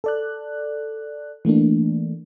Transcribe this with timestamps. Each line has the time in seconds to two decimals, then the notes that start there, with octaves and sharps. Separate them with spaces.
0.04 A4 D5 F#6
1.45 E3 A3 A#3 D4